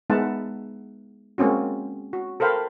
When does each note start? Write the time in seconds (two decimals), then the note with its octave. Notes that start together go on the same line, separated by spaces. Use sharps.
0.10 G#3 B3 D#4 E5 F#5 A5
1.38 G#3 A#3 C4 C#4 F#4
2.13 F#4
2.40 A4 A#4 C5 F5 G5 B5